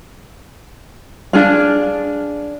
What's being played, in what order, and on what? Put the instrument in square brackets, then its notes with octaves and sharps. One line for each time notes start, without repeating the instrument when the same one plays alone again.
[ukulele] D4 G#4 F5